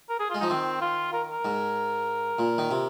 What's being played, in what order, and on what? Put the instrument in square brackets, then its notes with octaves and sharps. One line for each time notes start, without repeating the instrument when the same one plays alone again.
[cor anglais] A#4
G#4
[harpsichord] G#3 [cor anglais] F4
[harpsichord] F3 [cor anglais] D#4
[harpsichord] D#3 [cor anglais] C4
[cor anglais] F4
A#4
A#4
[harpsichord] G#2
A#2
D#3
C3